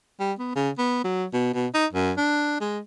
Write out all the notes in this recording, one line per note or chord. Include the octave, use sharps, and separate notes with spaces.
G3
B3
C#3
B3
F#3
B2
B2
D#4
F#2
D4
G#3